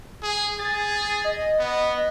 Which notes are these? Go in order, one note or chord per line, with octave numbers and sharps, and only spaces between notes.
G#4
G#4 A6
D#5
B3